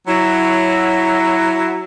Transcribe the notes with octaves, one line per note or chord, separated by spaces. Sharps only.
F#3 E4